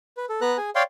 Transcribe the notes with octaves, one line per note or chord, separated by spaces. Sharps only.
B4
A4
B3 B4 A#5 F#6
G#4 G#5
C#5 D5 F5 G5 C6